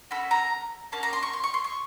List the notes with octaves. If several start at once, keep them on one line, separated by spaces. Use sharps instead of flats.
C#4 F#4 A4 B5
A#5
A#3 C#4 F#4 A5
A#5
C6
C#6
C6
C#6
C6
C#6